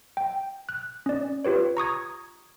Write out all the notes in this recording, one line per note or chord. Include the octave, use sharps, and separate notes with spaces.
G5
F#6
C#4 D5
F4 G4 B4 C#5
A#5 C#6 D#6 G#6